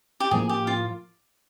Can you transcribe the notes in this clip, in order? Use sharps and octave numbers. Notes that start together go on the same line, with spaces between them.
G4
A2 F3 A#3 G#4
G4
F4